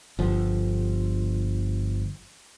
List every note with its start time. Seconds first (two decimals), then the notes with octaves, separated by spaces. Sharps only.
0.19 G1 F3